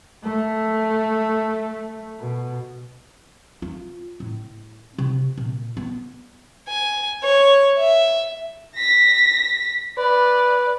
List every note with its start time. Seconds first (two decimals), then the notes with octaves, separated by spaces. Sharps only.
0.24 A3
2.20 B2
3.62 F4
4.20 A2
4.98 C3
5.38 A#2
5.77 B3
6.69 G#5
7.24 C#5
7.79 E5
8.76 A#6 B6
9.98 B4 D5